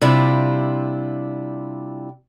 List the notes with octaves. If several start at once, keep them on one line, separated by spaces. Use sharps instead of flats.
C3 G3 D4 E4 F4